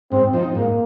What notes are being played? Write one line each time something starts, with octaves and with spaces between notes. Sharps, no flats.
G#2 C4
F3 C4 D#4
G#2 A#3